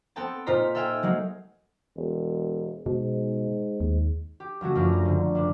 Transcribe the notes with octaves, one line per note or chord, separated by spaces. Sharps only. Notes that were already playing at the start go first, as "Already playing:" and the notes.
B3 C4 A4 G5 A5
A#2 D#4 F4 C5 A#5 B6
A4 E5 F5 G5 G#5
F#3 G#3 A#3 D#4
E1
G#2 B2
D#2
G4
C#2 F#3 A3 F#4
F#2 F3 D4
A#5
G#2 D3
F#1 D4